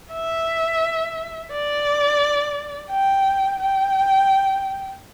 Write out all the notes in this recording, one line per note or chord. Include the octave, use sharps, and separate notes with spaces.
E5
D5
G5
G5